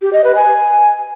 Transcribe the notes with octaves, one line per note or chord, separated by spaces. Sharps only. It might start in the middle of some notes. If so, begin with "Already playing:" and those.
G4
D#5
B4
G#5